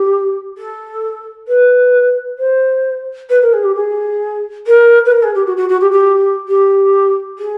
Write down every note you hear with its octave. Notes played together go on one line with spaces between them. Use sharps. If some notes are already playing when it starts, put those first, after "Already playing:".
Already playing: G4
A4
B4
C5
B4
A#4
G#4
G4
G#4
A#4
B4
A#4
G#4
G4
F#4
F#4
F#4
G4
G4
G4
G#4